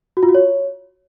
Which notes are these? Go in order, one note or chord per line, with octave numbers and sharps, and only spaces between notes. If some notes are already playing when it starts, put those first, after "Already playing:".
F#4
F4
F#4
C#5